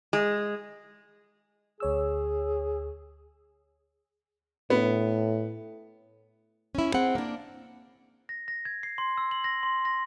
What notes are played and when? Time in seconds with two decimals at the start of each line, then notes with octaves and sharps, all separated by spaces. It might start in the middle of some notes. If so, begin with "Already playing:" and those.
0.13 G#3
1.80 D2 G#4 C#5 E6
4.70 A2 B3
6.75 C#4 E4
6.94 C4 G#4 F#5
7.15 A#3 D4
8.29 A#6
8.48 A#6
8.65 G#6
8.83 C7
8.98 C6
9.17 E6
9.31 F#7
9.44 A#6
9.63 C6
9.85 A#6